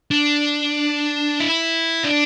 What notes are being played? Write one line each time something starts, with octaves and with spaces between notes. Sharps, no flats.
D4
E4
D4